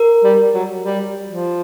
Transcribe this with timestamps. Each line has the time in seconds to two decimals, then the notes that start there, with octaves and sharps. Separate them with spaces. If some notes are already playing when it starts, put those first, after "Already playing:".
Already playing: A#4
0.24 G3
0.54 F#3
0.85 G3
1.29 F3